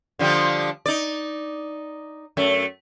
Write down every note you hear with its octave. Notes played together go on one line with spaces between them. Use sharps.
D3 F3 G3
D#4 D5
F#2 A3